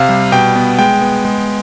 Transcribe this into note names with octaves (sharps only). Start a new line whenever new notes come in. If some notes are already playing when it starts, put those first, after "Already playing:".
Already playing: C3 F5
G3
B2 G5
B3
G#3 G5
B3
G#3